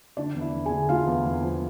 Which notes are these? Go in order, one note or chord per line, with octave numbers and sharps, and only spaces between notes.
D3 D4 D5
E2
E4 E5
E2
D3 G#4 G#5
D3 F4 F5
E2
E2
F3